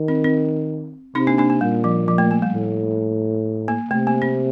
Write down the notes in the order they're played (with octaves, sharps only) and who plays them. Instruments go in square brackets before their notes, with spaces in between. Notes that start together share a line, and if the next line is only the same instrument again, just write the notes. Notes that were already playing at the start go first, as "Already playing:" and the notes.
Already playing: [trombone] D#3
[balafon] C4
C4
[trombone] C3 [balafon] C4 D#4
[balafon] A#3 D4
A#3 D4
A#3
[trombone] A#2 [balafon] G3
[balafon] F3
F3
A3
A#3
G3
[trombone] A2
[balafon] A#3
[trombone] C3 [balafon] A3
[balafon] A#3
C4